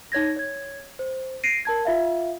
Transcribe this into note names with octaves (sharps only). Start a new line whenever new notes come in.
D#4 C#5 G#6 A#6
C#5 G#6
C5
A#6 C7 D7 D#7
A#4 A5 G#6
F4 E5 F5